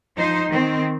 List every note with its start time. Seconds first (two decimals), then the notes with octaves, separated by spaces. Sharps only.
0.16 F3 D#4 C5 D#5
0.49 D#3 C4